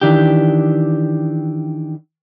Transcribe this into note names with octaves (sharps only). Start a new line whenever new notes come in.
D#3 E3 D4 G4